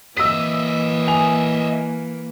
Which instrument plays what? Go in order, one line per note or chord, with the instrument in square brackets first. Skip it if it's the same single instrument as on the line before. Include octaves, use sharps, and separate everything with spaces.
[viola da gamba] E3 A#3 [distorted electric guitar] D#5 E5 [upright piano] E6 B6
[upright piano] G#5 F7